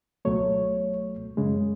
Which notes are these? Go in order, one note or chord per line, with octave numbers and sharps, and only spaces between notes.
C#2 B2 F#3 A3 C#5
F#2 C#3 G#3